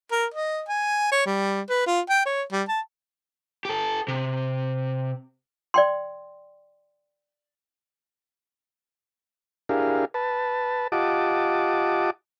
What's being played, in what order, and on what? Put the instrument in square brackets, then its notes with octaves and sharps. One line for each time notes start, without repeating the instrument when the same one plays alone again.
[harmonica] A#4
D#5
G#5
C#5
G3
B4
F4
G5
C#5
G3
A5
[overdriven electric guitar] G4 A4
C3
[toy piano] D5 G5 C6
[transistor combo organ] D4 E4 G4 G#4 A#4 F5
B4 A5
F4 G4 D#5 F#5 A5 D6